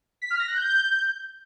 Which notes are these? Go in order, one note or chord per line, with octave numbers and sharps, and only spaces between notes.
B6
F6
A#6
F#6
G6